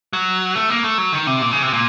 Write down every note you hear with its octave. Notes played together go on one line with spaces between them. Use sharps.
F#3
A3
A#3
A3
F#3
D#3
C3
A#2
C#3
C3
A#2